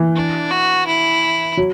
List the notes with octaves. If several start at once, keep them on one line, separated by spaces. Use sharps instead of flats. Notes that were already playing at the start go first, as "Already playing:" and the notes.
Already playing: E3
D4
F#4
E4
F#3